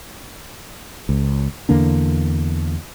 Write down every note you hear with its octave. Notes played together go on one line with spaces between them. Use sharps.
C#2
E2 D3 A#3 D4